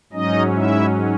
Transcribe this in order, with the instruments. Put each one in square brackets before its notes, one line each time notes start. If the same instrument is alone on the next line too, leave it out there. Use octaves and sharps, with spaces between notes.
[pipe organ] G#2 F#3 C#4 D#4 D#5
E4 E5